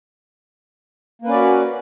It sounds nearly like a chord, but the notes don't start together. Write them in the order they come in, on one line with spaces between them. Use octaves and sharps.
A#3 B4 C#4 D5 F#4